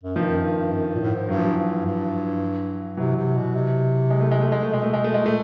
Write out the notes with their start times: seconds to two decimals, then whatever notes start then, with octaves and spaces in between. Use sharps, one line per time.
0.03 F#2
0.16 G2 D#3 F3
0.30 F#2
0.44 G2
0.58 G2
0.72 F#2
0.86 G2
0.95 A#2
1.01 A2
1.15 G#2
1.29 G2 F#3
1.37 F3
1.45 E3 F#3
1.57 G2
1.85 G2
2.97 C3 E3 F#3
3.16 C3
3.35 B2
3.55 C3
4.10 G#3
4.21 A3
4.31 G#3
4.41 A3
4.52 G#3
4.63 B2 A3
4.73 G#3
4.83 A3
4.93 B2 G#3
5.04 A3
5.14 G#3
5.23 A#2 A3